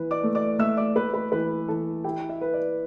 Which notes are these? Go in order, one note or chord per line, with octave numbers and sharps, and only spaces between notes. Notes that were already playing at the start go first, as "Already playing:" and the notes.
Already playing: E3 B4
D5 D6
A3
D5 D6
A3 E5 E6
D5 D6
A3 B4 B5
B4 B5
E3 B4 B5
E3 A4 A5
E4 G4 G5
E5
B4
D5